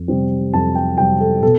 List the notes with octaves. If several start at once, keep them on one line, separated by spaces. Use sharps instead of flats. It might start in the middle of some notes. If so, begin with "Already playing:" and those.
Already playing: F2
C3 G3 C4
F2 A5
G5
C3 G3 C4 G5
A4
B2 A4